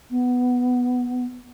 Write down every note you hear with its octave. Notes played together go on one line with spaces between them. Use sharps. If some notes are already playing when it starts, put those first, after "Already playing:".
B3